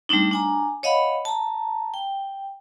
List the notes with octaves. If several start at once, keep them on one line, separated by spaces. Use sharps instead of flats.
G3 A3 C4 D4 D#4
D4 G#5 A#5
C#5 D#5 F5 F#5 B5
A5 A#5
G5